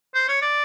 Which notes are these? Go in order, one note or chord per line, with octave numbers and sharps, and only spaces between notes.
C5
C#5
D5